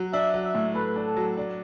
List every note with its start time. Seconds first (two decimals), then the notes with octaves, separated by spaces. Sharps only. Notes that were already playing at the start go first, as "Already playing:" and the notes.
Already playing: F#3
0.13 D4 E5
0.34 F#3
0.44 E5
0.54 A2
0.75 A3 B4
0.96 D4
1.06 A4
1.17 F#3
1.37 D4